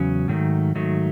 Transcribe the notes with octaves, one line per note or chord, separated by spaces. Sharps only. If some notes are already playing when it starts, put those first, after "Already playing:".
Already playing: E2 C#3 F#3 C#4
G#2 D#3 F#3 A3
G#2 D#3 F#3 A3